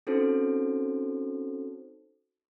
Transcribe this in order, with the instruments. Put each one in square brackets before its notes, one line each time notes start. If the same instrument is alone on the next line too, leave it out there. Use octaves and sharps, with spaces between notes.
[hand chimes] C4 C#4 D#4 F#4 A4 C5